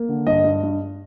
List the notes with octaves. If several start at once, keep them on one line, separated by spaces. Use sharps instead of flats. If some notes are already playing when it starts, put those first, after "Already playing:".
Already playing: A#3
D3
G2 D#5
G2
G2